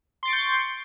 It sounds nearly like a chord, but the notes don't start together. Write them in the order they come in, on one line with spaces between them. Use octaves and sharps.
C6 A6 D7 C#6 G6